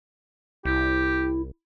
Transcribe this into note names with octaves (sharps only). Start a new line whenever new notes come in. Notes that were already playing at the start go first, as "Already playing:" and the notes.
C2 E4 G4